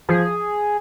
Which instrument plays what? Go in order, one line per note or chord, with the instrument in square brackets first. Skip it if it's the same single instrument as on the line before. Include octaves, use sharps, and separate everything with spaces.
[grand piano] F3 [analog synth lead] G#4